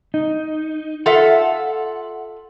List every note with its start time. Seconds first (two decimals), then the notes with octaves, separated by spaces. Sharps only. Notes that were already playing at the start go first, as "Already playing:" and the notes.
0.14 D#4
1.06 F4 A4 E5 F#5